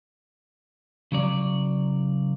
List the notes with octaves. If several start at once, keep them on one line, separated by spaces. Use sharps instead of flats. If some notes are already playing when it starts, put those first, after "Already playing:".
C#3 F#3 D5